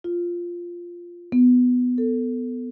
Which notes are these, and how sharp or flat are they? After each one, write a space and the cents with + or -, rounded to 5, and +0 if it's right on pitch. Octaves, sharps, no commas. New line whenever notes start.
F4 -5
B3 +10
A4 +15